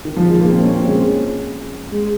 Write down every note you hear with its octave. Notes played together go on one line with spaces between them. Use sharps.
D#3
F3
G#3
A#3
C4
C#4
C4
G#3
G#3